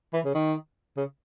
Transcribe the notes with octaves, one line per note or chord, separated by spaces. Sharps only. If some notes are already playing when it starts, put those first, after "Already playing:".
E3
C#3
D#3
C#3